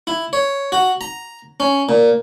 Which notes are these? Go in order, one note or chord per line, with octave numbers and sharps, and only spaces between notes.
E4
C#5
F#4
A#5
C#4
A#2